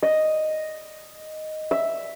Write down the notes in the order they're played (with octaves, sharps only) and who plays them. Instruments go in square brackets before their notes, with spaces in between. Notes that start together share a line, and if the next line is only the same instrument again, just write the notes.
[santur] D#5
E5